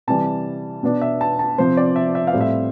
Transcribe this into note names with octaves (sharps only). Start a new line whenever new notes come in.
C3 E3 G3 A5
B2 B3 D4
E5
A5
A5
C3 F3 C4 C5
D5
E5
E5
F5
A2 G3 C4
E5